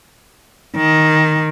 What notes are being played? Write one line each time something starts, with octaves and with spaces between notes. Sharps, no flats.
D#3